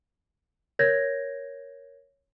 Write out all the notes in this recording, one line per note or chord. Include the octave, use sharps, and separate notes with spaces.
A#4 C#5 G6 G#6 A#6